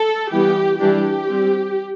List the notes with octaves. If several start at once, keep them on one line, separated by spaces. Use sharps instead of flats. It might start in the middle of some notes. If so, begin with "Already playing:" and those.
Already playing: A4
E3 G3 B3 G4
E3 G3 D4 G4
G3 C4